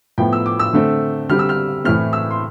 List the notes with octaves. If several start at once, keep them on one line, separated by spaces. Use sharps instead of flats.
A2 F3 B3 G5
E6
D6
E6
D3 A3 C4
D3 G3 C4 F6
E6
F6
A2 E3 A3 C4 F6
E6
C6